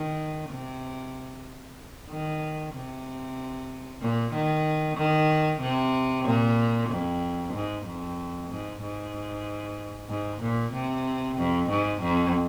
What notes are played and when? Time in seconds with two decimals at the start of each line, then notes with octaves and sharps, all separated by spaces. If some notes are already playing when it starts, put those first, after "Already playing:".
Already playing: D#3
0.49 C3
2.09 D#3
2.73 C3
4.01 A#2
4.33 D#3
4.97 D#3
5.61 C3
6.25 A#2
6.90 F2
7.54 G#2
7.86 F2
8.49 G#2
8.82 G#2
10.09 G#2
10.42 A#2
10.73 C3
11.38 F2
11.69 G#2
12.02 F2